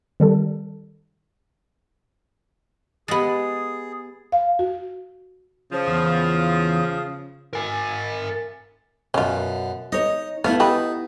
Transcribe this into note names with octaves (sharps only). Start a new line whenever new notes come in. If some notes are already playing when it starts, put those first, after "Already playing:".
D#3 G3 A4
G#3 B3 G4 G#4 A6
F5
F#4
C#3 F3
E2
A#4 G#5
F#2 B2 C#4 F4
D#4 C#5 D#5
A3 B3 E4 F4 F5
D#4 G4 A4 B4